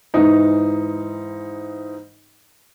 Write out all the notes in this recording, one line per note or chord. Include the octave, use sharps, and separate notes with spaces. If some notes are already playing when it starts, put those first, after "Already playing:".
G#2 E3 D#4